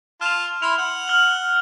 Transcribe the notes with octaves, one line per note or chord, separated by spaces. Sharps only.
F4 A5 F6 F7
E4 B5 C6 F7
F#5
F6 F#7